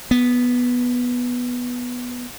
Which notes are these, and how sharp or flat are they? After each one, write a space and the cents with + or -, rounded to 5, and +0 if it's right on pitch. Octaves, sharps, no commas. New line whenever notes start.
B3 -5